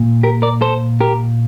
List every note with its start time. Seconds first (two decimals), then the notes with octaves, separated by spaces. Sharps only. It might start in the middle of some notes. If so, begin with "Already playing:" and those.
Already playing: A#2
0.23 G4 A#4
0.42 A#4 D5
0.61 A4 C5
1.01 G4 A#4